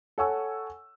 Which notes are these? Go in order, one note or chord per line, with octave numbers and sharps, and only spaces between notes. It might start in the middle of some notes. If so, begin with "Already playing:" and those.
A4 C#5 F#5 G#5 C#6 E6